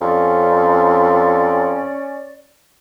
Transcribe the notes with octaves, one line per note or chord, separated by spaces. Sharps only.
F2 C#4 D5